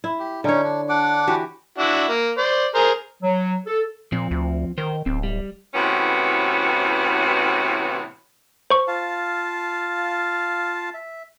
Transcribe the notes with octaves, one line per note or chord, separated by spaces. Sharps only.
E4
G4
D3 C#4 D#4 C#5
D4
D4 F#5 D6
E3 F#4 G4
D4 E4 F#4
A#3
C5 D5
G#4 A#4 C5
F#3
A4
A#2 F3 C4
D2
D#3 A#4 C5
D1 C4
G3
A2 C3 E3 B3 C#4 F#4
C5 C#6
F4 F5 A5
E5